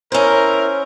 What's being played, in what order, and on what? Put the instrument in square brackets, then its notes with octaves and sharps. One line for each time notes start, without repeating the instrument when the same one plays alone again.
[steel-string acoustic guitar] C#4 C5 [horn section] E4 A#4